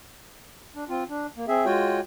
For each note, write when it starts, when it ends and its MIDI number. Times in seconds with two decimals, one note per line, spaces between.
0.76 0.84 62
0.89 1.04 60
0.89 1.04 65
1.09 1.27 62
1.36 1.45 58
1.48 1.65 60
1.48 1.65 68
1.48 1.65 76
1.65 2.00 56
1.65 2.00 65
1.65 2.00 66
1.65 2.00 73
1.65 2.00 79